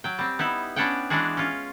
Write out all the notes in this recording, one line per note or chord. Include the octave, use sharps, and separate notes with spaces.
F#3 G5
G3 C4
B3 D#4 E4
B3 C#4 D4 C#5 F#5 G5
E3 G#3 D4 F#4 G#4
C#4 F4